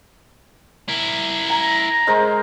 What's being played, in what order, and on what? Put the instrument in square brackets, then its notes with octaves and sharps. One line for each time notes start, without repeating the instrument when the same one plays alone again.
[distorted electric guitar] E4 A#4
[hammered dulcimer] G#5 [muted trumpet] A#5
[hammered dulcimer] G#3 A#4 C5